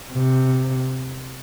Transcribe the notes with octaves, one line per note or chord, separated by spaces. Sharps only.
C3